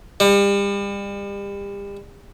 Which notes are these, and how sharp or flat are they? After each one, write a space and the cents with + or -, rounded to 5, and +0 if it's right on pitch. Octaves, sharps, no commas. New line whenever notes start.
G3 +35